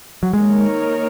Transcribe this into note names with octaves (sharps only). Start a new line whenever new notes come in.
F#3
D#3 G#3 A#3 D#4 A#4 C#5